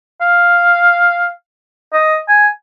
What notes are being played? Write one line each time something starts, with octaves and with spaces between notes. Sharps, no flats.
F5
D#5
G#5